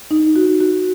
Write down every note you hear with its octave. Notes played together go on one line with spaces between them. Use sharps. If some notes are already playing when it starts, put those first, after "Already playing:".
D#4
F#4
F#4